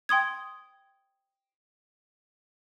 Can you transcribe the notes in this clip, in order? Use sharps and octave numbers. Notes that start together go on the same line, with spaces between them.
G5 C6 D#6 G#6